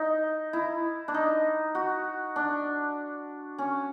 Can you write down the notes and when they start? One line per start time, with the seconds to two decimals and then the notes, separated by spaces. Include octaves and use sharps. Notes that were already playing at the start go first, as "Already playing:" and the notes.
Already playing: D#4
0.53 E4
1.08 D4
1.14 D#4
1.75 F#4
2.36 D4
3.58 C#4